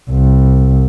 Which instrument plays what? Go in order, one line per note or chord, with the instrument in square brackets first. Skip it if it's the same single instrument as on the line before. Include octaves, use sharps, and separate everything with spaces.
[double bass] C2